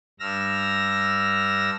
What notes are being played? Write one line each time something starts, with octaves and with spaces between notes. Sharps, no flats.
G2 E6 F6 A#6